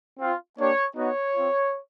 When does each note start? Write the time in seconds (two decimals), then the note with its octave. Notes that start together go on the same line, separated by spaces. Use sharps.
0.20 C4 F4
0.58 A#3 D4 G4 C#5
0.96 B3 D#4 F#4 C#5
1.35 C4 F4